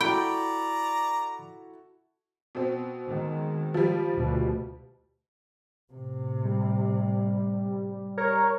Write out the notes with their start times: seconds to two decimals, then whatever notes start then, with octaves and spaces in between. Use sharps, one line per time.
0.01 E4 F#4 A4 D5 G5 A#5 B5
2.55 B2 C4
3.07 D#3 G#3
3.74 F3 G3
4.13 D2 B2
5.93 A2 C3
6.45 G3
8.17 A#4 C#5